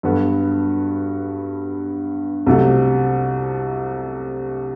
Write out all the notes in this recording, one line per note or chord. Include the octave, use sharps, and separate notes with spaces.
G2 F#3 B3 F#4 A4
C2 C3 F#3 A3